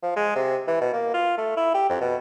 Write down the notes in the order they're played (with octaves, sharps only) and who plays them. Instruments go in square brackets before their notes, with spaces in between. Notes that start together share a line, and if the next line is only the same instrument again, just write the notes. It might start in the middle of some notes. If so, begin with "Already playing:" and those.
[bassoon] F3
G#3
C3
E3
B2
A#3
F4
A3
E4
G4
F2
B2